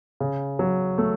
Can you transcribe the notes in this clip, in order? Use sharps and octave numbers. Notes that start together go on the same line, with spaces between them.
C#3
F#3
A3